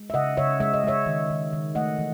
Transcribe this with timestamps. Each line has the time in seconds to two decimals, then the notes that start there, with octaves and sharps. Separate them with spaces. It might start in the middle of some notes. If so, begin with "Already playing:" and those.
Already playing: G#3
0.10 E5
0.14 C#3 D#5 F#5
0.37 C#3 C#5 E5
0.60 G#3 E5
0.74 D#5
0.84 G#3 C#5 E5
1.06 D#3
1.30 D#3
1.53 D#3
1.75 A3 D#5 F#5
1.99 E3